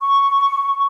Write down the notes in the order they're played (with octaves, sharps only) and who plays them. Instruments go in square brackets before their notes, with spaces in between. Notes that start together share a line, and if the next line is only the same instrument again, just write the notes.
[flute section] C#6